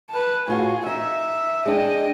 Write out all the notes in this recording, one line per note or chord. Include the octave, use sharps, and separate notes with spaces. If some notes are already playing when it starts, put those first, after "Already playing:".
B4 A5
A2 F4 F#4 G#4
D#4 E5
G#3 D4 D#5 G5